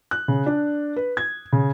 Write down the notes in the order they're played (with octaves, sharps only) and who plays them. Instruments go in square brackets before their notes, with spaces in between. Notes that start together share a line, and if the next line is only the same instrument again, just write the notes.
[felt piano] F#6
C#3
D4
B4
G#6
C#3